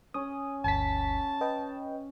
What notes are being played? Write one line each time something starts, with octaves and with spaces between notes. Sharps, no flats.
C#4 D#6
G1 D2 A5 B6
B4 D#5 G5